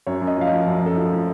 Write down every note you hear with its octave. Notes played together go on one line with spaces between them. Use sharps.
F#2 C#5
F#2
D#5
F3 F5
D#5
F3
F#2
F#2 A4
F3
F3